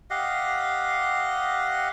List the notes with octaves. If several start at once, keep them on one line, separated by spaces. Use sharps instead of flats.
G4 D#5 F5 F#5